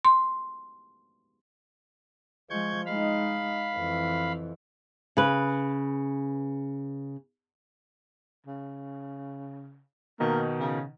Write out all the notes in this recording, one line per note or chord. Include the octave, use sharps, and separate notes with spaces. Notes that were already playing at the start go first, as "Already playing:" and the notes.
C6
F3 G#3 C#6 G6 G#6
G#3 D#4 F5 B5
F2 E3
C#3 B4
C#3
B2 D#3 A#3 D#4
C#3